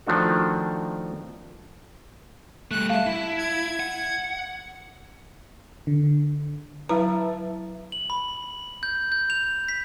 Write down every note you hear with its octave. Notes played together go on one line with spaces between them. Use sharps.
D#3 F3 A3 D4 F#4
G3 A3 F#6
E5 F5 A5
E4
G#6
F#5
D3
F#3 E4 B4 E5 A5 A#5
F#7
B5
G6
G6
F7
B6